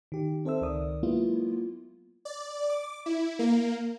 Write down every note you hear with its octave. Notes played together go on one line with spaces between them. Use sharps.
D#3 G4
C4 A4 C5 E5 E6
C#2 D#3 A#4 D5 D#6
F#3 G#3 A#3 B3 E4 F4
D5
D6
E4
A#3